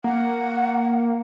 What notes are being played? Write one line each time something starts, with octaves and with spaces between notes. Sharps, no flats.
A#3 F#5